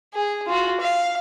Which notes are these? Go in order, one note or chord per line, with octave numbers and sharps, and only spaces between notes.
G#4
F4 F#4
F5